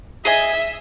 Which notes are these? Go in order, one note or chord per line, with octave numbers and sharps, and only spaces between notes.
G#4 D#5 E5 G#5